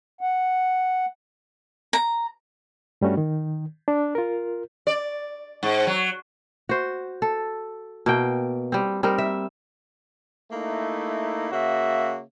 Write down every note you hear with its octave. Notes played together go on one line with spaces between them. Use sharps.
F#5
A#5
G2 G3 A3 C#4 F#4
D#3
D4
F4 A#4
D5
G#2
F#3
F#4 C5
A4
B2 A#3 G5
G3 C4
G3 C4 D#4 A#4
E5
A3 A#3 D#4 E4
C#3 A#3 F#4 E5